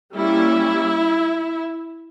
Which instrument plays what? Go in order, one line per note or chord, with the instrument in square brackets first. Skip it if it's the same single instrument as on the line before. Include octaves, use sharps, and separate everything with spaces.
[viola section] G3 A#3 C#4 E4